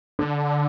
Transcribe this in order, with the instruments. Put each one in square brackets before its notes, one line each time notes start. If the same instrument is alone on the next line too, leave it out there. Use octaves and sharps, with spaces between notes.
[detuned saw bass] D3